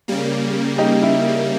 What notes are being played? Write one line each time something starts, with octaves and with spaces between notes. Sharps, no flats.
C#3 G3 A#3
D#4 G4
E4